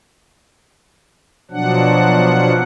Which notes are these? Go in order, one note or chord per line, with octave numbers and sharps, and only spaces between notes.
B2 F3 F#3 D4 F#5